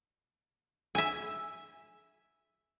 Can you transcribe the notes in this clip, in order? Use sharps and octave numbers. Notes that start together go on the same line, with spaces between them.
E5 G#5